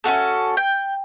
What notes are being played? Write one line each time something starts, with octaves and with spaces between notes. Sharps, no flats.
C#4 F4 F#4 A4
G5